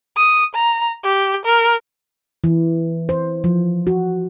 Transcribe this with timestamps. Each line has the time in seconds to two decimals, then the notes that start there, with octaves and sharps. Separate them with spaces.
0.17 D#6
0.55 A#5
1.04 G4
1.45 A#4
2.44 E3
3.09 C5
3.44 F3
3.87 F#4